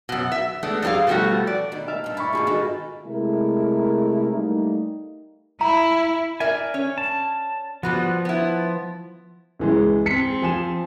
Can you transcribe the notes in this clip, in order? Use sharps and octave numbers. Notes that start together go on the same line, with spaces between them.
F#2 B2
E5
G#3 A3 B3 D4
F2 G3 D4 G#4 F5
B2 F3 G3 A3 F#4
D5
B2 D#3
E5 F5 A5
G2 A#2
E4 A5 B5 C#6
G#2 B2 D#3 F4 G#4 B4
D#3 F4 F#4 A4
C3 G#3 A3 E4 A#4
G3 A3 A#3 D#4
E4 A#5 B5
A#4 D5 E5 G#5
C#4 C#5
A5
F3 G3 B3 F#4
B3 E4
C#2 E3 G#3
C4 B6 C#7
F3 G#5 E7